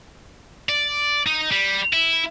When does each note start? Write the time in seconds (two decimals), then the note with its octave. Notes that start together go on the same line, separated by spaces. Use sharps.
0.69 D5
1.27 D#4
1.52 G3
1.93 E4